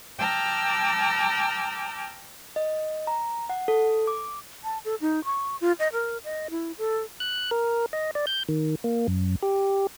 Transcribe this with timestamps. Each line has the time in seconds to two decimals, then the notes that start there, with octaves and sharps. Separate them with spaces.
0.19 G5 A5 A#5 D6 E6 F6
2.56 D#5
3.07 A#5
3.50 F#5
3.68 A4
4.07 D6
4.64 A5
4.85 A4
5.01 D#4
5.25 C#6
5.61 F4
5.79 D#5
5.93 A#4
6.24 D#5
6.51 E4
6.78 A4
7.20 F#6
7.51 A#4
7.93 D#5
8.15 D5
8.27 G6
8.49 D#3
8.84 A#3
9.08 F#2
9.43 G4